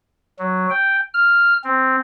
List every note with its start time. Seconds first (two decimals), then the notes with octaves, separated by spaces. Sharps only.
0.39 F#3
0.70 G5
1.14 F6
1.64 C4